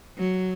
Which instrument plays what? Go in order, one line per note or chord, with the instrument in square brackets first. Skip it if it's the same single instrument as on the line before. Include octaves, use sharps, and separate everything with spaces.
[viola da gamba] F#3